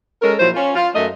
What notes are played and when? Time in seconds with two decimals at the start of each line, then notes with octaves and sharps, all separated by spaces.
0.21 G#3 C#4 A4 A#4
0.39 A#2 F3 F#3 E4 C5
0.54 C#4 F4
0.74 F4
0.94 F#2 A3 D#5